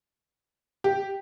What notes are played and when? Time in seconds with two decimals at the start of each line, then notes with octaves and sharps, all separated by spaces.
0.84 G4